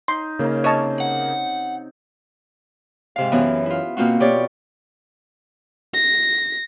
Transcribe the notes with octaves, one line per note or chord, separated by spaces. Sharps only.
D#4 C6
C#3 A#3 C#4 D#4
C3 C#5 D#5 A5
F#5
G#2 C3 F5
F#2 E3 B3
E4 F4
B2 A#3 C4 F4 F#4
B2 G4 C#5 D5
A#6